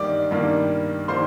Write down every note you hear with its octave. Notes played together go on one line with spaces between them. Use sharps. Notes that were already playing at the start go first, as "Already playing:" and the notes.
Already playing: G2 D#3 G3 A#3 G4 D5 D6
G2 D#3 G3 A#3
D#3 G3 A#3 C5 C6